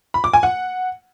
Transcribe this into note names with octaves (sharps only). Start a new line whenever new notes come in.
B5
D6
G#5
F#5